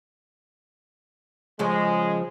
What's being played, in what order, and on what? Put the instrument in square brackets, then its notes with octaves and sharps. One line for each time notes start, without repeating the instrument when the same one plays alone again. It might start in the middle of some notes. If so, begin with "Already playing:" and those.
[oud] C#3 F3 [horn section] G#3